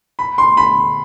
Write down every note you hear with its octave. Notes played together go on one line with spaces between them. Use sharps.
B5
C6
B5